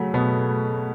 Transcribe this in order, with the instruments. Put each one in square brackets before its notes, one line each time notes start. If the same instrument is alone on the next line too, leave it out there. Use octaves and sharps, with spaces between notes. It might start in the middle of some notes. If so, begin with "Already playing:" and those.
Already playing: [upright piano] C#3 F#3 A3
B2 B3